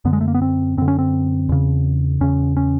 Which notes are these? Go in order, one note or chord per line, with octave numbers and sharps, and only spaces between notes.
F#2 D3 B3
G#3
A3
A#3
B3
C4
F#2 D3 C4
C#4
C4
E2 C#3
E2 C#3 C#4
C#4